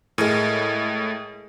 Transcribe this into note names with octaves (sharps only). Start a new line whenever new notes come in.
A2 G#3 A#4 G#5